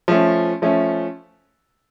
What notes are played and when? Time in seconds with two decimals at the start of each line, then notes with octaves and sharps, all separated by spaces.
0.08 F3 A3 C#4
0.62 F3 A3 C#4